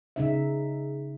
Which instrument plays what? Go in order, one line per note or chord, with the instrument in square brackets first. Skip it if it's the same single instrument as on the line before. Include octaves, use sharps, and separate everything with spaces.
[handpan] C#3 D#4 E5